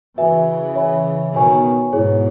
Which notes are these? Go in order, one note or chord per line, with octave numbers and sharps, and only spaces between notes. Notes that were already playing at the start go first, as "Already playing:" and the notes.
C#3 E3 F#4 B4 E5 G#5
C#5 E5 G#5 B5
B2 D#3 C#5 G#5 C#6
G#2 B2 E4 G#4 C#5